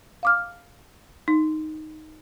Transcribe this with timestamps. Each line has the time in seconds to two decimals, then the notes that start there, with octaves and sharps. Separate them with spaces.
0.23 F5 D6 F6
1.28 D#4